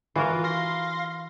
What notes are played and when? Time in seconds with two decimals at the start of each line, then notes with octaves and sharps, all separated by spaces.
0.16 E3 F4 F#4 A#4
0.44 F5 C6 A#6